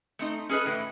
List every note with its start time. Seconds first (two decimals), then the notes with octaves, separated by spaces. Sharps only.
0.19 A3 C4 D#4
0.49 C#4 G#4 A4 B4 D#5
0.65 A2 E3 E4